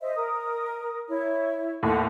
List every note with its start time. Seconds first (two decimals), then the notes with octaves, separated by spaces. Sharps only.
0.01 C5 D#5 E5
0.15 A#4 D#6
1.08 E4 C#5
1.83 D#2 A2 D#4 F#5